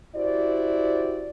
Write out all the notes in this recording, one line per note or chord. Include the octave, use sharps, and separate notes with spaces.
E4 F#4 G4 C5 D5